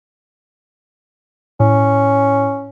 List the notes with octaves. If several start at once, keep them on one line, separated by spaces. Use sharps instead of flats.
A2 C#4